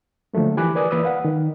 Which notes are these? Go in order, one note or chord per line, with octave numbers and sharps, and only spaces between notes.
D3 F3 F#3 A3 A#3
E3 G4 G#5 B5 D6 F#6
A#4 B4 D5 G#5 D6 D#6
E3 A#3 B4 D5 D#6 E6
B4 F5 F#5
D#3